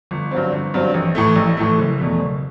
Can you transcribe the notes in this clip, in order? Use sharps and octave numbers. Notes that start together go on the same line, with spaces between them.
G1
G2 F#3 C4
G1
G2 F#3 C4
A1
A2 E3 A3
A1
A2 E3 A3
F#1
E2 B2 A3
F#1